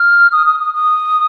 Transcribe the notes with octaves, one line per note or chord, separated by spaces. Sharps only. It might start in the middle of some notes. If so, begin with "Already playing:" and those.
Already playing: F6
D#6
D#6
D#6
D#6